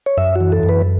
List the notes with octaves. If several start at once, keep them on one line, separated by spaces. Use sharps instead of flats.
C#5
F#2 E5
E3 F#4
A4
F#2
B4